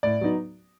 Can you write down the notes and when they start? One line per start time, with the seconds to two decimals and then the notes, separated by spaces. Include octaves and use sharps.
0.03 A2 D5
0.21 F#3 B3 D#4